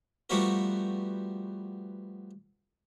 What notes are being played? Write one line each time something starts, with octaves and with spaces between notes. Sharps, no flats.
F3 G3 A3 B3 F#4 A#4